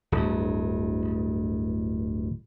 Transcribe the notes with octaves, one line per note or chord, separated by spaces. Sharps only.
D1 G2